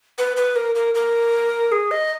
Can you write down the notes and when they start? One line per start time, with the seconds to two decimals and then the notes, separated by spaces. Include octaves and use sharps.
0.18 B4
0.37 B4
0.56 A#4
0.75 A#4
0.95 A#4
1.72 G#4
1.91 D#5